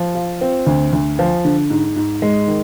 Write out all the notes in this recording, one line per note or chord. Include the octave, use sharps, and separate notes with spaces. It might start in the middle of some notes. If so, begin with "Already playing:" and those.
Already playing: F3
F4
C4
D2
D2
F3
D3
G#2
G#2
G#3
D#3